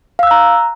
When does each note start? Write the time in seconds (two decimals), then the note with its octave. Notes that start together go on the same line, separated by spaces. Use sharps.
0.19 F5
0.23 E6
0.27 F#6
0.31 A#5